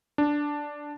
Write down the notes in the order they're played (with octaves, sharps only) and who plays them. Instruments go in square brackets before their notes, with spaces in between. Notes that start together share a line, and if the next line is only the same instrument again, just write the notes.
[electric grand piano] D4